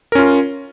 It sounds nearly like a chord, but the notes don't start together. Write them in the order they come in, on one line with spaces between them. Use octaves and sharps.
A#4 C#4 F4